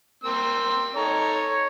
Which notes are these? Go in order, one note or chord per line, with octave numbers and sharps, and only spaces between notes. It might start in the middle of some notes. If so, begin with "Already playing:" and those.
A#3 C4 E6
D#4 A4 C#5 A#5